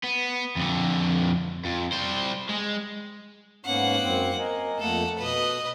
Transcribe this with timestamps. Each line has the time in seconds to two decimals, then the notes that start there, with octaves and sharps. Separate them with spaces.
0.03 B3
0.56 F2 D3
1.65 F2
1.92 G3 C5
2.49 G#3
3.65 G#2 A#3 B3 C#4 F#5
4.02 F#2 C4
4.39 A#4 D#5 G#5
4.79 F2 A3 A#3 A4 F#5
5.18 B2 B4 D#5